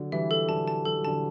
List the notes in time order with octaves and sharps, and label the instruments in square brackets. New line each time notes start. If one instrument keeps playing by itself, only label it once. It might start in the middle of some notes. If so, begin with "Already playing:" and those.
Already playing: [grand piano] D3 F#3
[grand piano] E3 G3 [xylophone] E5
[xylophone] A4
[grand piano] D3 F#3 [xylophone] A5
[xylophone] A5
[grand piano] F#3 [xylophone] A4
[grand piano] G3
[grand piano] D3 F#3 [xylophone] A5